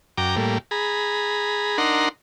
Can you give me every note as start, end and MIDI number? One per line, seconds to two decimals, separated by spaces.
0.18 0.36 42
0.18 0.36 79
0.18 0.36 82
0.18 0.36 86
0.36 0.58 45
0.36 0.58 55
0.36 0.58 58
0.71 1.78 68
0.71 1.78 82
0.71 1.78 83
1.78 2.09 62
1.78 2.09 63
1.78 2.09 70
1.78 2.09 78
1.78 2.09 82
1.78 2.09 84